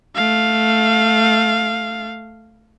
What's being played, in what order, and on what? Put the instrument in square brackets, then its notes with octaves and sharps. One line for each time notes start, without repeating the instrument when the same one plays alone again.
[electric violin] A3 F5